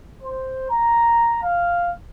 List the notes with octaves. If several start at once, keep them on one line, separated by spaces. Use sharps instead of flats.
C5
A#5
F5